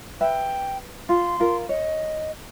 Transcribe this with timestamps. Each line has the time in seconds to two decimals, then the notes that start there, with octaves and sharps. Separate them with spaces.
0.21 B4 E5 G5
1.09 F4 C6
1.40 F4 A#4
1.69 C#5 D#5